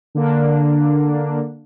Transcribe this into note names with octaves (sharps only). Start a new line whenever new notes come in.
D3 A#3 D4